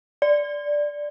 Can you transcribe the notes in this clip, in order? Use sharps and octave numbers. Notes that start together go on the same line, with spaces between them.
D5